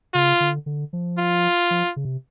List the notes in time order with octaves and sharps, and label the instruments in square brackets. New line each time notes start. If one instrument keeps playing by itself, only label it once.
[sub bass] C#3 [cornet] F4
[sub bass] D3
D3
F3
[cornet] F4
[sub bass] F3
C#3
C3